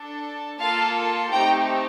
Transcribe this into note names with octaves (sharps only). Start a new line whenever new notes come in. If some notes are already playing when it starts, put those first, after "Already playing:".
Already playing: D4 A4
A#3 F4 A4 F5 A5
A3 C4 D#4 G4 G5 A#5